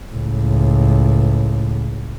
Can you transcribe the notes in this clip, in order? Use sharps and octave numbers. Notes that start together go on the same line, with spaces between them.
C#2 A2